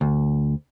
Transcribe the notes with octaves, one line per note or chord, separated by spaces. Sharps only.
D2